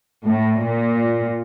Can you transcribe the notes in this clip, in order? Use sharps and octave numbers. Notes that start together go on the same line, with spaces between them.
A2
A#2